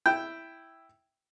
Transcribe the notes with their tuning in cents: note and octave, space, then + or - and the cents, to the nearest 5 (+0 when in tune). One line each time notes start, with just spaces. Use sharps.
E4 +0 G5 +0